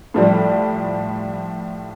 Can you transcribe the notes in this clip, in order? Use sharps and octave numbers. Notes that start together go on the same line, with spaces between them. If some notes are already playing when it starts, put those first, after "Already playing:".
A2 F3 G3